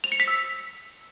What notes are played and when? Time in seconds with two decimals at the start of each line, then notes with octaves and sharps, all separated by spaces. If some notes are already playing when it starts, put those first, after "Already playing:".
0.04 F7
0.12 C#7
0.20 B6
0.28 E6